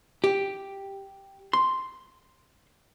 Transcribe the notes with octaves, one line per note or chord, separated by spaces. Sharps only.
G4
C6